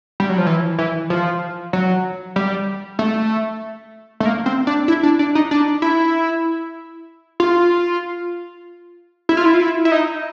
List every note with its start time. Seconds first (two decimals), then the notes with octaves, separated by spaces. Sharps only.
0.20 G3
0.30 F#3
0.38 F3
0.46 E3
0.78 E3
1.10 F3
1.73 F#3
2.36 G3
2.99 A3
4.20 A3
4.26 A#3
4.46 C4
4.67 D4
4.88 E4
5.03 D4
5.19 D4
5.35 D#4
5.51 D4
5.82 E4
7.40 F4
9.29 E4
9.37 F4
9.45 E4
9.54 F4
9.61 E4
9.85 E4
9.92 D#4